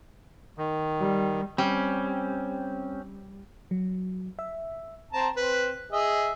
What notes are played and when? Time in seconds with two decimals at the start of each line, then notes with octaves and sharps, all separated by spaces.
0.58 D#3
0.99 G3
1.58 G3 C4 C#4
3.71 F#3
4.39 E5
5.13 C4 A5 A#5
5.37 C4 B4
5.92 G#4 D#5 E5